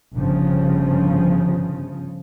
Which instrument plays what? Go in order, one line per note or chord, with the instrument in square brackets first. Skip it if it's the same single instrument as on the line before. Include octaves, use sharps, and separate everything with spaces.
[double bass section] G1 C#3 F3